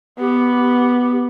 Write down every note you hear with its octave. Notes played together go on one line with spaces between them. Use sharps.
B3 G4